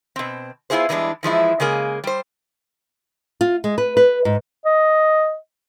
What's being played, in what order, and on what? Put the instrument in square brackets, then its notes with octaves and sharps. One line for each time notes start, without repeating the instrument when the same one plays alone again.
[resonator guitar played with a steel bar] B2 C4
B3 C#4 E4 F4 G#4 C5
E2 E3 G3 G#3 D4
E3 F3 G#3 E4
C#3 G#3 A#3 G#4
G3 C5
[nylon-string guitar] F4
G#3
B4
B4
G#2
[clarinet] D#5